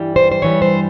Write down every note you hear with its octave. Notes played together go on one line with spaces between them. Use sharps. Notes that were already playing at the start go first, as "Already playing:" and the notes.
Already playing: G2 E3 G3
C5
C5
G2 E3 G3 C#5
C5